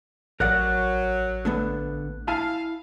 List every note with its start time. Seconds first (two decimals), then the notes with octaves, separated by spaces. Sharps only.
0.40 A1 F#3 A#4 D5 F#5 F#6
1.45 D3 A3 B3
2.28 E4 F5 G#5 A5